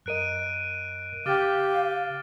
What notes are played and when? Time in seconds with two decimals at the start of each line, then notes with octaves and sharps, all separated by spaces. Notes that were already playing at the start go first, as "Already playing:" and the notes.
0.06 F#2 A#4 D#5 F#6 D7 D#7
1.26 C#3 G4 F5 D6 F6 A6